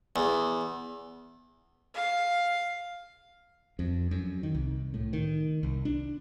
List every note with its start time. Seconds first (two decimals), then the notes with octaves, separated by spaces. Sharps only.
0.16 E2
1.94 F5
3.79 F2
4.11 F#2
4.43 D#3
4.55 C2
4.94 A2
5.13 D#3
5.63 C2
5.85 D4